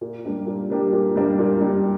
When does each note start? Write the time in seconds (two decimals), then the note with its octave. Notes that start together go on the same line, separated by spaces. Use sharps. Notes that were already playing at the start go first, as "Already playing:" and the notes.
0.01 A#2
0.24 G3 A#3 D4 G4
0.46 A#2
0.70 G3 A#3 D4 G4
0.93 A#2
1.16 G3 A#3 D4 G4
1.39 A#2
1.61 G3 A#3 D4 G4